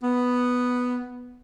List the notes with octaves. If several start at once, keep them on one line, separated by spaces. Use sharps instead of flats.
B3